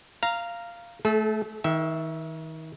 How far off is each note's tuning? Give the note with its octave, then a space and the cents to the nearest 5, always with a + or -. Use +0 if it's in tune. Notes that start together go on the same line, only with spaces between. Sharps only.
F5 -10 A#5 +0
A3 -15 A4 -45
D#3 +35 E5 +0 G5 -15